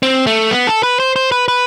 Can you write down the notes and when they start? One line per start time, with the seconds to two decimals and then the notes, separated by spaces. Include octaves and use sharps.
0.03 C4
0.27 A3
0.51 B3
0.67 A4
0.83 B4
1.00 C5
1.16 C5
1.32 B4
1.48 B4